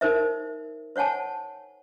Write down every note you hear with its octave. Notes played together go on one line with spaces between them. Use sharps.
D#4 A#4 C5 E5
C5 C#5 F#5 G#5 A5